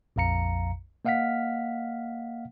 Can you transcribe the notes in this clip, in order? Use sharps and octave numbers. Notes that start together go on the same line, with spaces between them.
A#1 F2 F5 A#5 C#7
A#3 D#5 F5 F#5 F6 B6